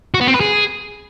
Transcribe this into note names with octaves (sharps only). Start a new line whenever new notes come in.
F#4
B3
C4
B4
G#4